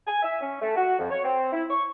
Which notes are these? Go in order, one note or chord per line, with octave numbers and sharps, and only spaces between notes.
G#5
E5
C#4
A3
F#4
F2
C#5
C4
E4
C#6